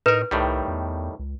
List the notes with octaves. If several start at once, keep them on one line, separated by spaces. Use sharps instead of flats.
A2 D#4 A#4 B4
C2 A2 D#3 G3
E2
C#2